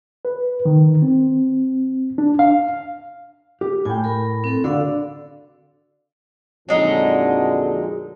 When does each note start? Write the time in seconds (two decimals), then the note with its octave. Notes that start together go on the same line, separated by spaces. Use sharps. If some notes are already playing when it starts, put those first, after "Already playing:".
0.25 B4
0.65 D#3
1.02 C4
2.18 D4
2.39 F5
3.61 G4
3.85 A2 G5 G#5
4.04 A#4 B5
4.44 C4 A4
4.64 D3 F#4 A4 D5 F5
6.69 F2 A#2 D3 F#3 G#3 D#4